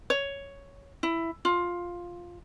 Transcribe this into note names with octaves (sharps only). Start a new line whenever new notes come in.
C#5
E4
F4